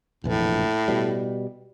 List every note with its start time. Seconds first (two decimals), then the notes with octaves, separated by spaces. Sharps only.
0.24 F1 A#1 A2 E3
0.88 B2 G3